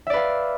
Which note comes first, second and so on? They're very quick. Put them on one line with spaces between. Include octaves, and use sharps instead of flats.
E5 D5 B4 F5